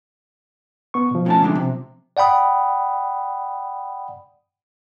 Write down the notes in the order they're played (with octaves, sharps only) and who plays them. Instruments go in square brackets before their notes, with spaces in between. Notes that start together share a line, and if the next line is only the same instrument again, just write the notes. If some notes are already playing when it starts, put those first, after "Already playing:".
[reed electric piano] B3 C#6
B2 F3
[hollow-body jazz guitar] A2 C#4 A5
D3 G#3 D4
C3
[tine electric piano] D5 F#5 G5 B5 D#6